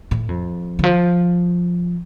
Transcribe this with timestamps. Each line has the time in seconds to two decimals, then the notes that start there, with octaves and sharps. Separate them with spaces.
0.11 A2
0.29 F2
0.79 D3
0.84 F3